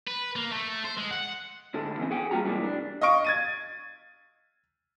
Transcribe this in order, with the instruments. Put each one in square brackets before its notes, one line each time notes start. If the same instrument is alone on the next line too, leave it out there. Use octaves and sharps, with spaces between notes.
[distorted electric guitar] B4
A#3
A3
C5
G#3
F#5
[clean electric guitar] D2 G#2 D3 A4
E3 B3 C4
G#4 F#5 G5
G3 A#3 F4 F#4 A#5
F#2 C3 E3 G3 G#3 A#3
D4
[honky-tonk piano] D#5 F5 C#6 D7
G#6 A6 D#7